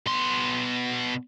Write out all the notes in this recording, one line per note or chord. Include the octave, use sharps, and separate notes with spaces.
B2 C6